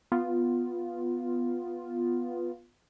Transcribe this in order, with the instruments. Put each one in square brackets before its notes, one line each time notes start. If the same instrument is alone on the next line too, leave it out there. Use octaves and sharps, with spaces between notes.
[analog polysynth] B3 F4